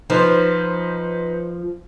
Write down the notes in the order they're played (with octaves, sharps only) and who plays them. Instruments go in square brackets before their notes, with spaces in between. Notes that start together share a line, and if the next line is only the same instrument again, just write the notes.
[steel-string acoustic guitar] F3 [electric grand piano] D#4 B4 C5